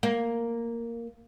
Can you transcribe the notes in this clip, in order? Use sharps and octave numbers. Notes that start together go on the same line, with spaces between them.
A#3